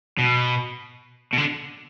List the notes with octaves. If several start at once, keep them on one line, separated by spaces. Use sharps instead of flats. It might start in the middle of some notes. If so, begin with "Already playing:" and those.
B2
B2
D3